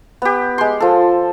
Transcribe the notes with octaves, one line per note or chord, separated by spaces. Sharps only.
B3 G4
G#3 C6
F3 A4